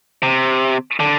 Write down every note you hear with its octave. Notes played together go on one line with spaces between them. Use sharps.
C3
D3